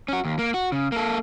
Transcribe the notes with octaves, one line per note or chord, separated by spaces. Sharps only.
C#4 F#4
D#2
A#3
F#4
C#3
A#3 A4